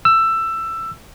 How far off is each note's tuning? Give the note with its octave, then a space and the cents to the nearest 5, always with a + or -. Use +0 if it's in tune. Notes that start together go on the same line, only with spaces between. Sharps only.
E6 +15